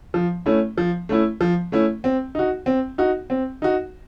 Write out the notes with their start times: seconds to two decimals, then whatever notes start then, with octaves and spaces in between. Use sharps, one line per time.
0.14 F3
0.46 A3 C#4 E4
0.77 F3
1.09 A3 C#4 E4
1.41 F3
1.72 A3 C#4 E4
2.04 C4
2.35 D#4 F#4
2.66 C4
2.98 D#4 F#4
3.30 C4
3.62 D#4 F#4